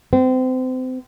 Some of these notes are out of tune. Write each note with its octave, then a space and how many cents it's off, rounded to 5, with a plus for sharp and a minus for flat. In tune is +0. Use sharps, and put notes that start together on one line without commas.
C4 -30